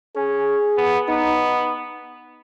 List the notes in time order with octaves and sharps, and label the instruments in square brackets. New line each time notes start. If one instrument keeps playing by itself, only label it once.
[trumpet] C#4 [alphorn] G#4
[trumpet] B3
[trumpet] B3 [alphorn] D#4